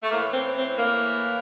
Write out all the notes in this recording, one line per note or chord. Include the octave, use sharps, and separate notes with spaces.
A3
A2 E3 A#3
C4
C4
A#3